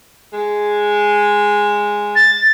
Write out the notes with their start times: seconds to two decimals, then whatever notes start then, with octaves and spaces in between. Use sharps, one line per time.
0.33 G#3
2.16 A6